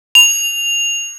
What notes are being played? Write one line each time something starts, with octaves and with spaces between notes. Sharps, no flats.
F7